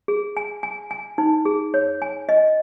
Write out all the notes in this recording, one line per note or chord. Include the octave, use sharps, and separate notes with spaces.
G#4
G#5
G#5
G#5
D#4
G#4
C#5
G#5
D#5